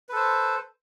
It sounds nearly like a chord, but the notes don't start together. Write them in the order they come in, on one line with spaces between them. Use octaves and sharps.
B4 A4 C5